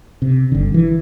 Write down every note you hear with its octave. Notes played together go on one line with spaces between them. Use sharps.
C3
G1 D3
E3